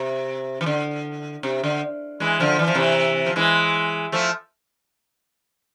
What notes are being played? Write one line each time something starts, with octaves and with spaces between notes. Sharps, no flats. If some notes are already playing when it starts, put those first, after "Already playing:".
Already playing: C3
E3
D3
C3
D3
E3 G#3
D3 F3
E3
F3
C3 E3
F3
E3 G#3
F3 A3